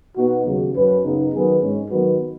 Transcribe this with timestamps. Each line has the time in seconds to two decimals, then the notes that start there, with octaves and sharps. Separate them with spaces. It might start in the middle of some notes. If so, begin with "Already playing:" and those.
0.17 B2 B3 D#4 F#4
0.46 D#2 C#3 F#3
0.75 F#2 F#3 C#4 B4
1.03 F#2 C#3 B3 D#4
1.33 D#3 F#3 B3 G#4 B4
1.61 G#2 G#3 C#4
1.90 D#3 F#3 B3 F#4 B4